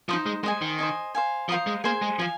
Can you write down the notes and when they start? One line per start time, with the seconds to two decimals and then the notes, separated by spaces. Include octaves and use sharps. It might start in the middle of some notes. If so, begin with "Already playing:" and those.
0.09 F3 D#4 C5 D#5
0.26 G#3
0.43 G#3 C5 D#5 G#5
0.62 D#3
0.79 C5 D#5 G#5
1.15 C5 F5 G#5
1.49 F3 C5 F5 A#5 D#6
1.67 G#3
1.84 A#3 G#4 C5 G#5
2.02 G#3
2.19 F3 F5 G#5